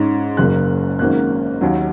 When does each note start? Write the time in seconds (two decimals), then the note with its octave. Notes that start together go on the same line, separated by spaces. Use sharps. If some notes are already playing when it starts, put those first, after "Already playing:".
Already playing: G#2 G#3 C#4
0.37 F#1 F#2 C#3 A#3 F#6
0.99 G#1 G#2 F#3 A#3 C#4 F#6
1.61 D#2 D#3 F#3